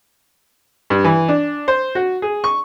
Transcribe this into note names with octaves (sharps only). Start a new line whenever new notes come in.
G2
E3
D4
C5
F#4
G#4
C#6